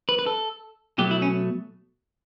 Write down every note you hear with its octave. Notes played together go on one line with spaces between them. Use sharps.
B4
B4
A4
B2 F#3 A3 G4
E4
C#4